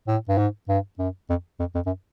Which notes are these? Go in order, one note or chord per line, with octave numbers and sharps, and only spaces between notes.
A2
G2
G#2
G2
F#2
F2
F2
F2
F#2